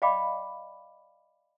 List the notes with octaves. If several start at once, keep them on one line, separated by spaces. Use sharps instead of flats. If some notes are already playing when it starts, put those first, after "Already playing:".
D5 D#5 F5 G5 B5 D6